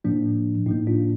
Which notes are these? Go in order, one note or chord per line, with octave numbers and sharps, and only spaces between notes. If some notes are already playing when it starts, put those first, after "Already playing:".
A2 F3 A#3 D4
A2 F3 A#3 D#4
D4 F4